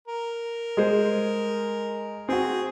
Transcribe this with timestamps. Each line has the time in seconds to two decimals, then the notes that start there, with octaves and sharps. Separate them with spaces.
0.08 A#4
0.77 G#3 G#4 C5
2.29 C4 F#4 G#4